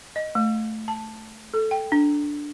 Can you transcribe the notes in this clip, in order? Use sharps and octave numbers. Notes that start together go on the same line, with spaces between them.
D#5
A3
A5
A4
G5
D4